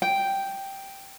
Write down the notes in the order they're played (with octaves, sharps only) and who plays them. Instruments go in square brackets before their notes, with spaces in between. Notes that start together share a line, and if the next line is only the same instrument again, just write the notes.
[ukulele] G5